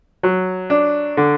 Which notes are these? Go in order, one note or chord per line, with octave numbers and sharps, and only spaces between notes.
F#3
D4
D3